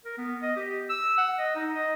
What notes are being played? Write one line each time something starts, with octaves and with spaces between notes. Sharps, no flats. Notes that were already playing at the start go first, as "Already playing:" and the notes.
A#4
B3
D#5
G4
E6
F#5
D#5
D#4
D#5